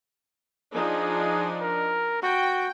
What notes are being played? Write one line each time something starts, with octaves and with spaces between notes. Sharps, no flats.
F3 D4 D#4 G#4
A#4
F#4 G5